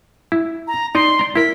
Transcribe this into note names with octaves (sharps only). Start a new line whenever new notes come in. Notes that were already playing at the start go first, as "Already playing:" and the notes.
E4
A#5
D#4 D5 D#5 C6
D5 A#5
E4 A#4 B6